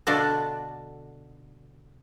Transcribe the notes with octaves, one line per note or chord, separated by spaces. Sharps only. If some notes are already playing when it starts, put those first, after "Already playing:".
B2 D3 D4 F4 F#4 A4